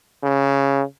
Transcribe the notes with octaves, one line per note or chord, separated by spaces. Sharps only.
C#3